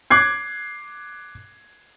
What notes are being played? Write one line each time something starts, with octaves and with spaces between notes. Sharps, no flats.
D6 F#6 G#6 C7